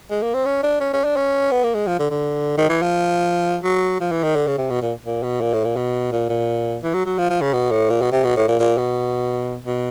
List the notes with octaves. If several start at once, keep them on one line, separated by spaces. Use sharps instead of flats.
G#3
A#3
C4
C#4
D4
C#4
C#4
D4
C#4
B3
A#3
G#3
F3
D3
D3
D#3
E3
F3
F#3
F3
E3
D#3
D3
C#3
C3
B2
A#2
A#2
B2
A#2
A2
A#2
B2
A#2
A#2
E3
F#3
F#3
F3
F3
C#3
B2
A2
A#2
B2
C3
B2
A2
A#2
A#2
B2
B2